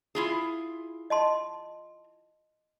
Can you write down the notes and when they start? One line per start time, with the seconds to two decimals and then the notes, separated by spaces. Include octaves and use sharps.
0.15 E4 F4 G#4
1.10 D#5 A5 C6